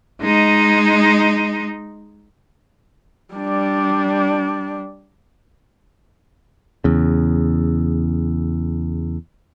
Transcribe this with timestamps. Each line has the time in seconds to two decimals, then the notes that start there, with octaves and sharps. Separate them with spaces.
0.22 G#3 D#4
3.34 G3 D4
6.84 E2 C#3